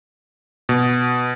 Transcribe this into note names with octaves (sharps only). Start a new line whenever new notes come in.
B2